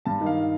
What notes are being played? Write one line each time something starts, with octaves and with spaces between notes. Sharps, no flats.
G2 A5
D#3
F5